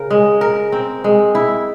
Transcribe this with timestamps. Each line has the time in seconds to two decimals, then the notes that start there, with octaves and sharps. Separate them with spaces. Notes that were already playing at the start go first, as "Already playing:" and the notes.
Already playing: C#3 A#4
0.11 G#3
0.41 A#4
0.72 C4
1.04 G#3
1.35 E4